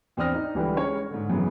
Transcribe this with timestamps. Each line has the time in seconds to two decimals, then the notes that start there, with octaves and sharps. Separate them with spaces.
0.17 E2 C4 D4 D#6 F6 A#6
0.34 D4 D#4
0.55 C#2 D3 E3 G3 G4 B4
0.74 G#3 C#4 C#5
1.11 G#2 D3
1.29 F#2 C#3 E3 B3